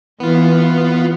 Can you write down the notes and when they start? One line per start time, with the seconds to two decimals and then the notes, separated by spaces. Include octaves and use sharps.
0.20 E3 B3 F4